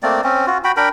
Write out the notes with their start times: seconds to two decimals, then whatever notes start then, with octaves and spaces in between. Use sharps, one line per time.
0.03 A3 A#3 C4 D5
0.24 C4 C#4
0.47 F4 F#4
0.64 F#4 G5 B5
0.77 D4 A#4 G5 B5